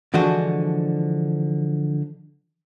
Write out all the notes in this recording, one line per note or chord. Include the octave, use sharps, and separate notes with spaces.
D3 E3 F3 G#3 D4 F#4